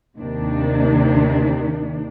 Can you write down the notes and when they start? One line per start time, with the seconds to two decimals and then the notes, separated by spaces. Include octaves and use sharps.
0.18 D#2 C3 D#3 D4